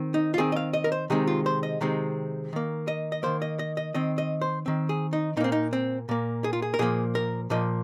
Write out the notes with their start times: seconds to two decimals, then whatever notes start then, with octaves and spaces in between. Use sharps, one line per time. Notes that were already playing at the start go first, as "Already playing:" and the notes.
Already playing: D#3 C4
0.14 D#4
0.34 F4
0.38 D#3 C4 G#4
0.52 D#5
0.56 F5
0.73 D#5
0.84 A#4
0.92 C5
1.10 C3 D#3 G#3 C4 G#4
1.27 F4
1.46 C5
1.63 D#5
1.81 C3 D#3 G#3 C4
2.53 D#3 A#3
2.88 D#5
3.12 D#5
3.23 D#3 A#3 C5
3.42 D#5
3.59 D#5
3.77 D#5
3.94 D#3 C4 D#5
4.18 D#5
4.41 C5
4.66 D#3 C4
4.89 G#4
5.13 D#4
5.37 A#2 D#4
5.40 A#3 C4
5.52 D#4
5.73 C4
6.09 A#2 A#3
6.44 G#4
6.53 F4
6.62 G#4
6.74 A#4
6.79 A#2 F3 A#3 G#4
7.15 A#4
7.50 A#2 F3 A#3 D#5